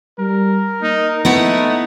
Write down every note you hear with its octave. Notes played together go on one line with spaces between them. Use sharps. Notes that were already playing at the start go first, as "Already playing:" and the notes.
G3 A#4
A#3 D#4
A3 B3 D#4 E4 F#5